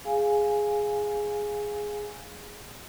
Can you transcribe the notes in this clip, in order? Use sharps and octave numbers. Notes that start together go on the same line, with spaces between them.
G#4 F5 G#5